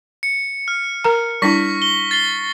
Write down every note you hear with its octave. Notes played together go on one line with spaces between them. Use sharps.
C#7
F6
A#4 A#5
G3 D4 E4 C#6 A#6 B6
G7
A6 C7 G7